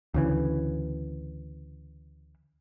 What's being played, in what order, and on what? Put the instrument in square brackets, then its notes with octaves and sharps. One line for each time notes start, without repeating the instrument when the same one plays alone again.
[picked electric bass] D2 C#3 E3